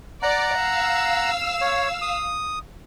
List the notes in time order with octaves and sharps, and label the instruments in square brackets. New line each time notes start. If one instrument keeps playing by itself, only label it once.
[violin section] D5 [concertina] F#5 A#5
[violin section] F5 E6
[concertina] C#5
D#6